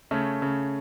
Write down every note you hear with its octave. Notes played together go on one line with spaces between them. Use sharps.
C#3 A3 C#4
C#3